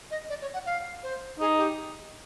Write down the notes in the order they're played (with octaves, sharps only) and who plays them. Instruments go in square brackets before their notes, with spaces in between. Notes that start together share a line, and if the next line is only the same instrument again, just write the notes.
[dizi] D#5
D5
C#5
F#5
F5
C5
[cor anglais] D#4 [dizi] G#4
[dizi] G4